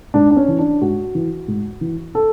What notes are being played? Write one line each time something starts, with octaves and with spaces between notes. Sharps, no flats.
G#2 D4
D4
C#4
E3
D4
G#2 F#4
E3
G#2
E3
A4